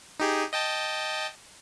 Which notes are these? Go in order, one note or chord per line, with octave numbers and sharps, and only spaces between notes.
D#4 G4 G#4
D#5 G5 A5